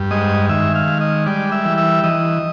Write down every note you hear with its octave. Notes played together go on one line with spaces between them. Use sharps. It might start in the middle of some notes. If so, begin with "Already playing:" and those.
Already playing: G2
G#3 D#5
D#3 E5
F5
G#3
D#5
G3 D5
E5
E3
E5
E3 D#5